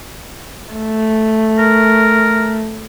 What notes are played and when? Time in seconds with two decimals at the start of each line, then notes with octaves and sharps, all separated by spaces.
0.74 A3
1.59 A#4